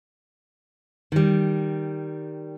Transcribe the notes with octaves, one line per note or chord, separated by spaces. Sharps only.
D#3 G3